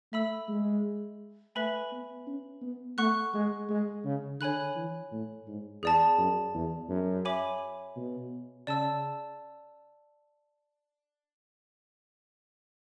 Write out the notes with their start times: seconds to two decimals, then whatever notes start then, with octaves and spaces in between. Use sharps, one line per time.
0.12 A3 E5 B5 E6
0.48 G#3
1.55 A3 B4 E5 G#5 B5
1.92 B3
2.27 C#4
2.62 B3
2.98 A3 F#5 C#6 F#6
3.34 G#3
3.69 G#3
4.05 C#3
4.41 D3 C#5 G#5 B5 F#6
4.75 E3
5.11 A2
5.47 G#2
5.82 E2 G#4 D5 A5
6.18 F#2
6.54 E2
6.89 F#2
7.25 C#5 E5 G#5 B5 D6
7.96 B2
8.67 C#3 D5 A5 E6